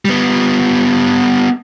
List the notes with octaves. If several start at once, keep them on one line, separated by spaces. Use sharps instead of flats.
G3 B3